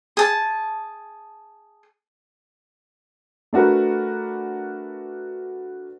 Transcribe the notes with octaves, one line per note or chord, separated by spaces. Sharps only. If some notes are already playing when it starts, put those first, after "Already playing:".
G#4 A5
A3 D4 F#4 A#4 B4